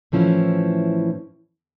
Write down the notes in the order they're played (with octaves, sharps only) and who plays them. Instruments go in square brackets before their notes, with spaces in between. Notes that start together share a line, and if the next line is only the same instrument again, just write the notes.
[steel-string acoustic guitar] A2 E3 F3 C#4 E4